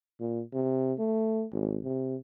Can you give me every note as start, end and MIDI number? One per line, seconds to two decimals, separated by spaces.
0.20 0.41 46
0.53 0.93 48
0.99 1.45 57
1.52 1.78 32
1.84 2.16 48